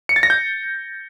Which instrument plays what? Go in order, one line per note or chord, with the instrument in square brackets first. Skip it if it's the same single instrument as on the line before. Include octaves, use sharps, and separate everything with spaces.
[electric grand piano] C#7
A6
A#6
G6